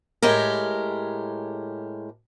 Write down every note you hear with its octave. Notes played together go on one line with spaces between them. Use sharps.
A2 G#3 G4 A#4